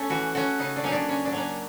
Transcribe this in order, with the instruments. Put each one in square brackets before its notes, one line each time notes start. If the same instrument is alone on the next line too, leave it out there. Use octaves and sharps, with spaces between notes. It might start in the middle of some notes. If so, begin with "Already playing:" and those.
Already playing: [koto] A3 C#4
E3 F#4
A3 C#4 F#4
C#3 D#4
D4
F#3 A#3 C#4 D#4
D4
C#3 C#4
D4
F#3 A#3 C#4